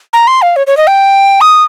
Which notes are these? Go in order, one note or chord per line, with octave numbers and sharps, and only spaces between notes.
A#5
C6
F5
C#5
C#5
D#5
G5
D#6